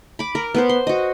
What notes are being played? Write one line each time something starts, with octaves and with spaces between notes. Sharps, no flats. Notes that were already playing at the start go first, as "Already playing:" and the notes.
B5 D6
A#4
B3 B4 C5
C6
F#4 D#5